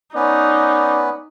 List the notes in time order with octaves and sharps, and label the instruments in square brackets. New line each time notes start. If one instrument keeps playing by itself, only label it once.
[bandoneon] B3 C#4 B4 [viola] D#4 [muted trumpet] D5